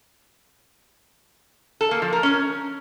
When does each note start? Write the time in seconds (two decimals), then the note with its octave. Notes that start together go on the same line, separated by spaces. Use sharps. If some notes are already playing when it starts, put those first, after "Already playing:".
1.81 A4
1.91 A#3
2.02 F3
2.13 A#4
2.23 C#4